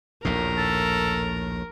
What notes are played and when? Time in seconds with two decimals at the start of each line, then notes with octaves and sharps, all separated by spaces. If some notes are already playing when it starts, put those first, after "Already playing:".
0.25 A#1 D#2 A2 A#4
0.57 A4